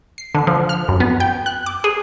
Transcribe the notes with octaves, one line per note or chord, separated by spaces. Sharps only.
C7
D3
F3
F6
F#2
B3
G5
F#6
D6
G#4